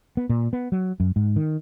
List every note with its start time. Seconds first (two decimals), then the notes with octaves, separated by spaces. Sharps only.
0.17 B3
0.29 A#2
0.53 B3
0.72 F#3
1.00 F#2
1.16 G#2
1.36 D#3